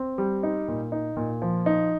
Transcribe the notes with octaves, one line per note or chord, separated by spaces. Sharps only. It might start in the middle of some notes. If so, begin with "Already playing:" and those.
Already playing: C4
G3
D#4
A#2
D#4
A#2
F3
D#4